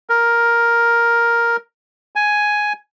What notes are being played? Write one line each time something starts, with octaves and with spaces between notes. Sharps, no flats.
A#4
G#5